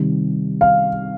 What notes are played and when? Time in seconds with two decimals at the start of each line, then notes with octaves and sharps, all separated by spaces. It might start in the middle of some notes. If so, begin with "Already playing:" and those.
Already playing: C3 D#3 G3
0.61 F5